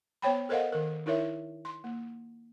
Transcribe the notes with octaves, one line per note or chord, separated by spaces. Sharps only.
B3 C5 C#5 G5 B5
A4 A#4 C5 D#5 F5 F#5
D#3 A#4
D#4 E4 A#4 C#5 E5
C6
A#3